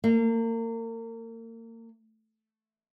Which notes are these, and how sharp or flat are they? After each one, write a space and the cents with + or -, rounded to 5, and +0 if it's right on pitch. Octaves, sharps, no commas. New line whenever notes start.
A#3 -35